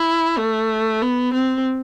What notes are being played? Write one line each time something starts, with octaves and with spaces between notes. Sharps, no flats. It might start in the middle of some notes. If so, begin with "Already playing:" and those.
Already playing: E4
A3
B3
C4